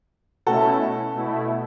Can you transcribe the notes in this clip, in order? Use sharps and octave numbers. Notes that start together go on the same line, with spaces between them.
B2 A3 C#4 E4 F#4 A4
B2 A3 E4